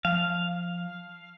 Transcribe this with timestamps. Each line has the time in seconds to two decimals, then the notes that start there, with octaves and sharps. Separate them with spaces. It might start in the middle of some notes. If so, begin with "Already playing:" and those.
0.05 F3 F5